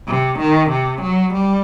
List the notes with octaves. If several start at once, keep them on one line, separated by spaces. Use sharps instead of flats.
C3
D#3
C3
F#3
G3